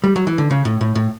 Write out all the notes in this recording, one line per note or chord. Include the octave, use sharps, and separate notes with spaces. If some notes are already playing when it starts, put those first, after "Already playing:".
G3
F#3
E3
D3
C#3
A2
A2
A2